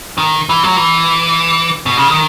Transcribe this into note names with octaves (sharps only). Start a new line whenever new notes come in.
D#3
E3
F#3
E3
B2
C#3
D#3